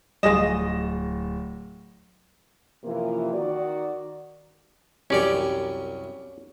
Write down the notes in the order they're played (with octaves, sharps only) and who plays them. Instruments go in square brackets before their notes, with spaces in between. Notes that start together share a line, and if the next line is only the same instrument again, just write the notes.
[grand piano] D1 A#6 E7 [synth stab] G3 G#4 [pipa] F4 D#5
[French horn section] F#2 C3 E3 F3 A#3 F4
D#3 F#4 D5
[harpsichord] C2 F#2 G4 [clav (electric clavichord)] C#4 D5